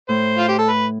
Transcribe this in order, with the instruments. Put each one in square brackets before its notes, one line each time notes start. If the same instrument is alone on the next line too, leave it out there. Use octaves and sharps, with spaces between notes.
[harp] A2 [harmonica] C5
[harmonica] F4
G4
A4
B4